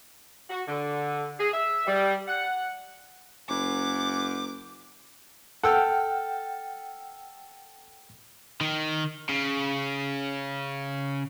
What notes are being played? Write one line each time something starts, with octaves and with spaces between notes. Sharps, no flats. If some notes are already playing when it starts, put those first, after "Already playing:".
F#4
D3
G#4
E5
G3
F#5
F#1 F#2 D6
A4 F#5 G5 E6 F6
D#3
C#3